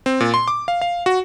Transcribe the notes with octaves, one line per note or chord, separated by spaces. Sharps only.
C4
A#2
C6
D6
F5
F5
F#4